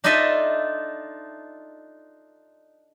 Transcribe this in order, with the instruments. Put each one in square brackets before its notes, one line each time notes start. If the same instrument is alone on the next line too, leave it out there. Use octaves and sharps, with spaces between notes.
[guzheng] D4 D#4 F4 A4 D#5 E5